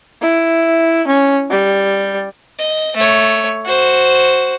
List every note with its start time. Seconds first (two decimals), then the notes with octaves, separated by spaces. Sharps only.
0.22 E4
1.07 C#4
1.51 G3
2.59 D#5
2.96 A3 C#5
3.66 F#4 C5